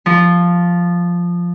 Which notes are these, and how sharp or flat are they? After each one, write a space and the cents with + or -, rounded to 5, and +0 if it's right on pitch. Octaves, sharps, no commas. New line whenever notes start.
F3 +0 C6 +25